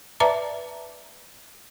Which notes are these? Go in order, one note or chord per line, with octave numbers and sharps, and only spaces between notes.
B4 D5 E5 A5 A#5 D6